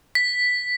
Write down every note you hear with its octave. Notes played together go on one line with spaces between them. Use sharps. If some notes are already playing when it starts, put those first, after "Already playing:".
B6